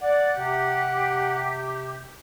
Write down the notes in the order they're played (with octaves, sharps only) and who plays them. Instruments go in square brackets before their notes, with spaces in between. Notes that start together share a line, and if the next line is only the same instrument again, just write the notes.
[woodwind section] D5 [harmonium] F#5
[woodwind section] C3 G4